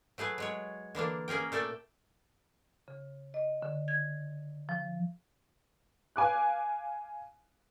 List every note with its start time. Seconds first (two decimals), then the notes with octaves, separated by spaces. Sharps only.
0.18 F#3 A3 G#4 B4
0.38 F#3 G#3 C#5
0.95 D3 E3 A#3 D4
1.28 A#3 C#4 G#4 A#4 G5
1.52 A#2 A3 A4 D5 G5
2.88 C#3
3.34 D#5
3.62 D3
3.88 G#6
4.69 F3
6.16 F5 G#5 D6 F#6